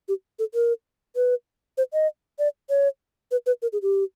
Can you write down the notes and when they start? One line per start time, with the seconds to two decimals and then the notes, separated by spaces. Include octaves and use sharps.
0.08 G4
0.39 A4
0.54 A#4
1.16 B4
1.77 C5
1.93 D#5
2.39 D5
2.70 C#5
3.31 B4
3.46 B4
3.62 A#4
3.73 G#4
3.82 G4